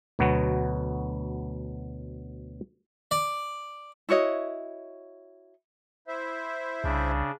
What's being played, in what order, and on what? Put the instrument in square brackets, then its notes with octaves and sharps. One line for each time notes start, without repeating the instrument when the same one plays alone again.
[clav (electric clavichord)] D2 B2 F#3 B3
[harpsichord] D5
[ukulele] E4 F#4 C#5 D#5
[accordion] E4 C5 E5
[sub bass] C2 [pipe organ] C#3 D4